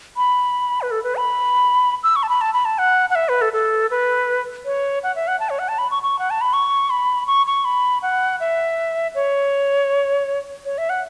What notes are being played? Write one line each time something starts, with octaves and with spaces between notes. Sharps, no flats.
B5
B4
A4
B4
B5
E6
C#6
A5
B5
A5
B5
A5
F#5
F#5
E5
B4
A4
A4
B4
C#5
F#5
E5
F#5
A5
C#5
F#5
A5
B5
C#6
C#6
F#5
A5
B5
C#6
B5
C#6
C#6
B5
F#5
E5
C#5
C#5
E5
F#5